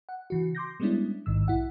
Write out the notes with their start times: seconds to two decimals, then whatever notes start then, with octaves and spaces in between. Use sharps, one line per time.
0.09 F#5
0.30 C#3 E3 F#4
0.55 C6 D6 G6 A#6
0.80 G3 G#3 B3 C#4 D4 E4
1.26 A1 G#2 D#3 E6
1.48 B1 E4 F#5